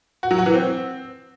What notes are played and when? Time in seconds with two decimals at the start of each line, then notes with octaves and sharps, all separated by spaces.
0.23 F#4
0.31 F#3
0.38 F#4
0.46 E3
0.54 C4